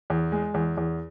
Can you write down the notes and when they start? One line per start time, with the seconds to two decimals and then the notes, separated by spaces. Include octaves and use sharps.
0.10 E2
0.32 G#3
0.54 E2
0.77 E2